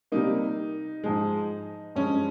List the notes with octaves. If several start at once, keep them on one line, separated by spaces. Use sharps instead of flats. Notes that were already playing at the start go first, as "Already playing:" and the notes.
C3 G3 A#3 D#4
G#2 F3 G#3
G2 F3 G#3 C#4